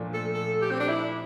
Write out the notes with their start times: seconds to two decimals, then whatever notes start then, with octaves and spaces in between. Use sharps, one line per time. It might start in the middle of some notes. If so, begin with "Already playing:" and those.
Already playing: A#2 F3 A3 D4
0.14 A4
0.34 A4
0.62 G4
0.71 C4
0.80 D4
0.89 E4